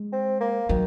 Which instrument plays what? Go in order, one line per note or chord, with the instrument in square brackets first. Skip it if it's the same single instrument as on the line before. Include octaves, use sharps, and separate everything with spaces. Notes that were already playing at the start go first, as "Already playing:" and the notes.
Already playing: [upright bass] G#3
[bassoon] C4
A#3
[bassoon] D#3 [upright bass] F#3